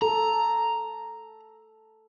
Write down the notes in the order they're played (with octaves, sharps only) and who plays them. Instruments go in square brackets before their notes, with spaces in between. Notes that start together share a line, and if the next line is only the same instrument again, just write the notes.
[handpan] A4 [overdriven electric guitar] A#5